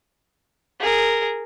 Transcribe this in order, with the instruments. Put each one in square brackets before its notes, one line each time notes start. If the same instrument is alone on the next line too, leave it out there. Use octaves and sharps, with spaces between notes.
[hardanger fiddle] G#4 A#4